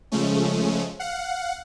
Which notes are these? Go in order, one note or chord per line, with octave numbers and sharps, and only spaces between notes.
C#3 F3 G#3 A3 C#4
F5 F#5